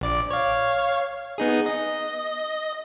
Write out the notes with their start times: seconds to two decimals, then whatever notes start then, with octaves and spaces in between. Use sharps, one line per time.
0.01 A#1 D5 D6
0.31 C#5 F5
1.38 B3 D#4 G#4
1.66 D#5